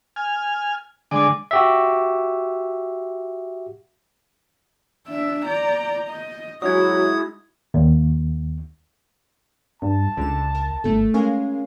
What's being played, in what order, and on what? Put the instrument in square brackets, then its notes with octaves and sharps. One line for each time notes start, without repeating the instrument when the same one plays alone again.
[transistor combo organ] G#5 F6
[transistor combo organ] D3 G#3 D5 [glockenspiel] G#5 D6
[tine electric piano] F#4 G4 E5
[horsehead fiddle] D4 E5
[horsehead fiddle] D5 A#5 [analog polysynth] G6
[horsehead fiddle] D#5
[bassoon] F#3 [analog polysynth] G#3 D#4 E4 [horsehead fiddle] F#4 [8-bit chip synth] D#6 G#6
[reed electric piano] D#2
[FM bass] G2 [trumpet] A5
[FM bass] C#2 [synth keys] D3 E7
[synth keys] A#4
[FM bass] G1 [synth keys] A3 A4
[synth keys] G#3 A#4 F5 [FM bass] C#4